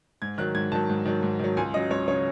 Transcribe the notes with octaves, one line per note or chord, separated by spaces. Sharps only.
G#2 G#6
D#3 F#3 F#6
G#2 G#6
D#3 F#3 A5
G#2
D#3 F#3
G#2
D#3 F#3
C#2 G#5
C#3 F#3 D#5
C#2 C#5
C#3 F#3 C#5